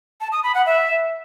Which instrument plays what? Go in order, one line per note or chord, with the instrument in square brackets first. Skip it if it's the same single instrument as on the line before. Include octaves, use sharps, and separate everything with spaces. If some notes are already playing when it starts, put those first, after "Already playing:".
[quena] A5
D#6
B5
F#5
E5